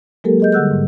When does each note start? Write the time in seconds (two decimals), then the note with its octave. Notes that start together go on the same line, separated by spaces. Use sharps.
0.24 F#3 G#3 A#3 G4 A4 A#4
0.40 G#4 D#5 G6
0.52 D3 G3 F#5 E6 F#6 G6
0.71 G#2